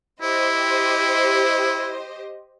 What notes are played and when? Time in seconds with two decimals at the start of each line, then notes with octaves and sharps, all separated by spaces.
0.22 E4 G4 C5 D#5